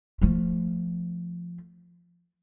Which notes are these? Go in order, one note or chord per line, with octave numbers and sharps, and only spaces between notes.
F3 A3